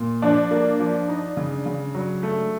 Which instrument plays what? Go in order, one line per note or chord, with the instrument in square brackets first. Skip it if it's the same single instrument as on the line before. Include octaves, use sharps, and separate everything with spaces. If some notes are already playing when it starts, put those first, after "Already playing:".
Already playing: [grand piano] A#2
[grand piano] F3 [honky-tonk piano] D4
[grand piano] A#3
F3
D#4
C#3
C#3
F#3
A3